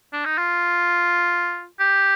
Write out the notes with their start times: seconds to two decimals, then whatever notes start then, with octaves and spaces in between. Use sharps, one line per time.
0.13 D4
0.25 D#4
0.38 F4
1.80 G4